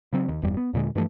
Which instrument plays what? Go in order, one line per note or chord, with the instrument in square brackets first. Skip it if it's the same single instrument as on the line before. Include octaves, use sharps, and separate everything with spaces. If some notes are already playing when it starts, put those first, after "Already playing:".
[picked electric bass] C#3 F#3 C4
D#2
F1 E2 G2 G3
B3
D#2 A#2 D3 G#3
G2 E3 F3 A3